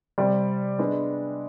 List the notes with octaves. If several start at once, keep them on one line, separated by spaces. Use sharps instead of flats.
C3 G3 C4 G4 D5
G#3 B3 D4